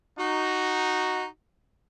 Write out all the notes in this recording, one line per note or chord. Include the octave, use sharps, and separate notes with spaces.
D#4 F#4